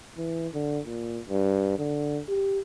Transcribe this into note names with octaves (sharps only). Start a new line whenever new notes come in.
E3
D3
A#2
G2
D3
G4